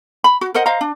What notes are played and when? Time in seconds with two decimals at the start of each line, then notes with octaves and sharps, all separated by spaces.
0.24 B5
0.41 F#4
0.54 A#4 C5 D#5 F#5
0.66 C5 D#5 F5 A#5
0.81 D4